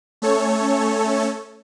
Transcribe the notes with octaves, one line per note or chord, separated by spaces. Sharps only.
A3 C#4 A4 C#5